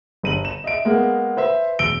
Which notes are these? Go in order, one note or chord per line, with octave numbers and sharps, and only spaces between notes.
G1 D#7 F#7
E7
D#5 E5 D7
G#3 A#3 B3
B4 C5 E5
E1 E6 D7 G7